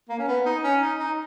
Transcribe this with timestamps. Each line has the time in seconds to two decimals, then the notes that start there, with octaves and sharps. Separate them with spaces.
0.09 A#3
0.19 C#4
0.28 B3
0.46 D#4
0.64 C#4
0.81 D#4
0.99 D#4